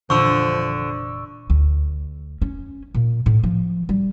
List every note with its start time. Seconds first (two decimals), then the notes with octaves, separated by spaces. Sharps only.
0.10 F1 A#2 D3 E3 F3 C#6 E6
1.50 D2
2.42 C#4
2.94 A#2
3.26 A2
3.43 F3
3.89 G3